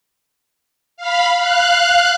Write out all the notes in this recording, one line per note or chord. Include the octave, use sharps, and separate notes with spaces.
F5 B5
F5 F#6